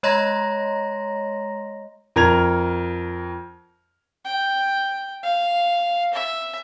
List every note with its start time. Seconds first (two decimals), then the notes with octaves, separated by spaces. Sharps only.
0.03 G#3 C#5 D#5 A#5 C6 A#6
2.16 F2 A#4 G#6 F7
4.25 G5
5.23 F5
6.13 E5